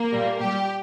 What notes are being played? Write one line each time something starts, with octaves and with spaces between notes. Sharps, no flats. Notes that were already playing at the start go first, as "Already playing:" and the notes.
Already playing: A#3
A#2 G3
A#2 G3 G4